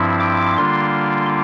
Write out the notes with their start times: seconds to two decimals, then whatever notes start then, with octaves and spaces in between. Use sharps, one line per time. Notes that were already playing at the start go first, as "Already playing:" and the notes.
Already playing: G2 F3 C4 E4
0.20 D6
0.58 D3 G3 A#3 D4 F4 C6